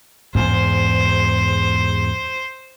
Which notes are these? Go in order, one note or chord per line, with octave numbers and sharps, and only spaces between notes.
E2 G#2 C5